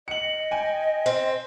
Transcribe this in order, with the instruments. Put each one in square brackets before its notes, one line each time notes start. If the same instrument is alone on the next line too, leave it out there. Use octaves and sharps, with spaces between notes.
[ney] D#5 [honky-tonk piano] C#7 F#7
[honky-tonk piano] G5 G#5
[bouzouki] C4